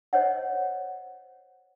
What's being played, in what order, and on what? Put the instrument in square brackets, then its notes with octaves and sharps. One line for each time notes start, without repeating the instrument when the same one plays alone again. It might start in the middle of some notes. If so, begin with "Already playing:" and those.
[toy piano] C5 C#5 D#5 F#5